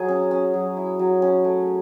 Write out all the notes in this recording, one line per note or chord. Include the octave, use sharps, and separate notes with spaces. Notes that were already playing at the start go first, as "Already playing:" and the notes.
Already playing: F#3 G#4
C#4
C#4
F#3
E4
F#3
C#4
A3